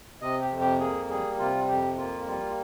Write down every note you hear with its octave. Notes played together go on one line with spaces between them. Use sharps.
C3 D#5
G4
F2
G4
A#3 G#4
G3 G#4
C3 F4
F2 G4
A#3 F4
G3 F4